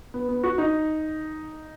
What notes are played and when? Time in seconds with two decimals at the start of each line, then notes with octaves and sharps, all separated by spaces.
0.14 B3
0.29 B3
0.44 F#4
0.58 D#4